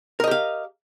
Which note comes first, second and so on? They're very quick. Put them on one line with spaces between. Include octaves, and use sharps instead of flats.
A#4 D#5 G4 F5